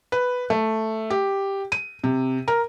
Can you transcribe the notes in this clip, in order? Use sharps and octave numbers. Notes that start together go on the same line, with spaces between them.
B4
A3
G4
D#7
C3
A#4